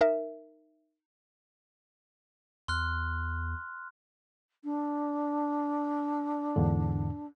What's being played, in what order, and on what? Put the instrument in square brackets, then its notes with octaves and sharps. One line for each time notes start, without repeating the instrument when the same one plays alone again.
[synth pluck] D#4 A#4 E5
[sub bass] E2 [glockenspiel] C6 F6 F#6
[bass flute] D4
[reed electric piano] E2 G#2 D3